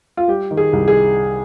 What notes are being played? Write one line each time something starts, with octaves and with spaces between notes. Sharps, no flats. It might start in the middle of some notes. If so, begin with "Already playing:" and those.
F4
G3 G4
D#3
G#4
C2
G#4